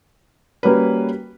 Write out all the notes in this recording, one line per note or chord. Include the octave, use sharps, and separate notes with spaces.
G3 A#3 C#4 F#4 B4